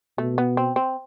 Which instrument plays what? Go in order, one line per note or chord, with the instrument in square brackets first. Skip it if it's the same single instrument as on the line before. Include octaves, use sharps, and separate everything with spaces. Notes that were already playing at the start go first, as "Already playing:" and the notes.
[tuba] B2 [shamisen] A3
[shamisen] B3
C4
C4